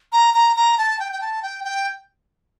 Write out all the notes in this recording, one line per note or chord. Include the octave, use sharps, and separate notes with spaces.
A#5
A#5
A#5
A5
G5
G5
A5
G5
G5